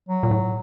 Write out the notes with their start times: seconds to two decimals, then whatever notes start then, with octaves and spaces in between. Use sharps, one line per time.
0.08 F#3
0.23 A#2
0.31 A2